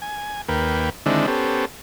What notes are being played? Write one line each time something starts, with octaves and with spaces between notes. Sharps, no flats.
G#5
D#2 A#3 B4 G5
D3 D#3 G#3 C4 D4 E4
B3 C#4 G4 A4 C5